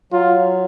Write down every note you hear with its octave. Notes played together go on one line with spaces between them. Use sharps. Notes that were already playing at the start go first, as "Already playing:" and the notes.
F#3 F4